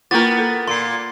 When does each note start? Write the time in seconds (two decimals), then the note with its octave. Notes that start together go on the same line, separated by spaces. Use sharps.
0.11 A#3 B3 E4 F4 A#4 A6
0.39 A4
0.68 A#2 C6 C7